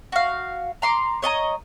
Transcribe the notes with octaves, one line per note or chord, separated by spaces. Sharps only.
F#4 F5
A#5 C6 D6
C#5 D#5 A5 A#5